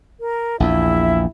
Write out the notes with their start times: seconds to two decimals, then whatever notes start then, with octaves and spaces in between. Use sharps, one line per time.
0.20 A#4
0.60 A#1 E2 E4 E5